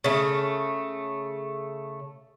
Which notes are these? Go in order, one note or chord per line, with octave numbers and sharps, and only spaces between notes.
C#3 A3